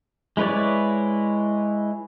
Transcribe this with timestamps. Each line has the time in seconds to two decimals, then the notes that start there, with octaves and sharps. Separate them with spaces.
0.37 G#3 E4 B4 C#5 D5